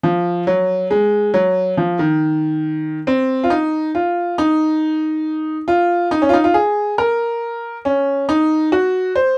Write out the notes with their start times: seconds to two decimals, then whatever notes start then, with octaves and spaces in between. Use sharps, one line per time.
0.03 F3
0.47 F#3
0.91 G#3
1.34 F#3
1.77 F3
1.99 D#3
3.07 C4
3.44 F4
3.50 D#4
3.95 F4
4.38 D#4
5.68 F4
6.11 D#4
6.22 C#4
6.29 F4
6.33 D#4
6.44 F4
6.54 G#4
6.98 A#4
7.85 C#4
8.29 D#4
8.72 F#4
9.16 C5